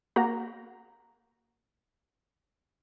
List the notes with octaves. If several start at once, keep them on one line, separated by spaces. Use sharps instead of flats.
A#3 F#4 A#5